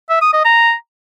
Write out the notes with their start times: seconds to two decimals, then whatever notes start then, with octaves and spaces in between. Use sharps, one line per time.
0.10 E5
0.21 D#6
0.33 D#5
0.45 A#5